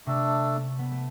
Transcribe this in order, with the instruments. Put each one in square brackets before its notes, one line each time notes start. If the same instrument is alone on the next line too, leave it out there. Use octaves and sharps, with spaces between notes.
[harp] C3 [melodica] A3 D4 A4
[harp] B3
A3